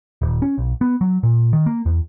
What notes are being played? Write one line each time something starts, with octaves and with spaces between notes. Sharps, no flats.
D#1
C#4
B1
B3
F#3
A#2
D#3
A#3
E2